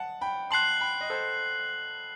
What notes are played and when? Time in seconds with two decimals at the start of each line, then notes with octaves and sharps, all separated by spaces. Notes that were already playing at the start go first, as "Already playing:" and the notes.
Already playing: F#5 A5
0.21 G5 B5
0.51 A5 C6 F#6 C7 F#7
0.81 G5 B5
1.01 D#5
1.10 A4 C5